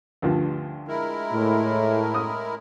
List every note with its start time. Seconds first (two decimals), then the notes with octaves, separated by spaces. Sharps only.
0.22 D2 G2 F3
0.88 G#3 E4 A#4
1.32 A2
2.14 D#6